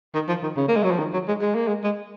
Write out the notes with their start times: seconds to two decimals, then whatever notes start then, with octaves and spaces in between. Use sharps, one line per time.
0.14 D#3
0.28 F3
0.43 D#3
0.57 C#3
0.68 A#3
0.76 G#3
0.83 F#3
0.91 F3
0.99 D#3
1.13 F#3
1.28 G#3
1.41 G#3
1.55 A#3
1.67 G#3
1.84 G#3